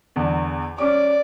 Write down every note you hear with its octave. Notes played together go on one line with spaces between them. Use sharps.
E2 D3
C#4 D5 D6